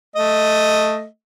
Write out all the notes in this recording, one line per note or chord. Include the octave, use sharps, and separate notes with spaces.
A3 D#5